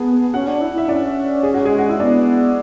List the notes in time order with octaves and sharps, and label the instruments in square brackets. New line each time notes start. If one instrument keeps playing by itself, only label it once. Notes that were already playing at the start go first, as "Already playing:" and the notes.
Already playing: [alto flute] B3 [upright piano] G#4 G#5 A5
[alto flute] C#4 [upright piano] F#4 F#5
[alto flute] D4
E4
[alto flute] E4 [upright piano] E5
[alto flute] C#4 [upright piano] D4 D5
[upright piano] G#4
F#4
G#3 G#4
F#4
E4
[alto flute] B3 [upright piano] D4